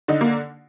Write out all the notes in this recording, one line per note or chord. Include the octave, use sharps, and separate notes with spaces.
D3 D#4
A#3